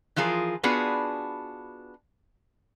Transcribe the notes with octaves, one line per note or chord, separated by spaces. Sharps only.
E3 F3 F4 G#4 A#4
B3 D4 F4 F#4 G#4 B4